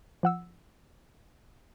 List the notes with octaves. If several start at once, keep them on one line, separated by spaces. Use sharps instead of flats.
F3 F#5 E6